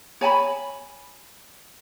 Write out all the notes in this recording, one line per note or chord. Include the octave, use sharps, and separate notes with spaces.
C#5 G#5 A5 B5